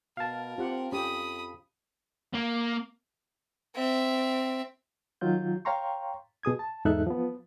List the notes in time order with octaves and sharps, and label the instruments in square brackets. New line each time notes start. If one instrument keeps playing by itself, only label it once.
[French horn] B2 [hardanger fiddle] A#4 [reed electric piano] F5 A5
[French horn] C4 [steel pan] F4 G4 F#5
[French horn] F2 [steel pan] C#4 G4 [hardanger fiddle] B5 D#6
[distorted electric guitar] A#3
[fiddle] C4 E5
[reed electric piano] D#3 F#3 F4 G6
C#5 F5 G5 A#5 C6 C#6
B2 G#4 D#6 G#6
A5
E2 G#2 D#4 A4 E5 F#6
F3 B3